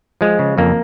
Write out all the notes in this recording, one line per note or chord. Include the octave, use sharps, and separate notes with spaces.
F3 G#3
C#3
F2 A#3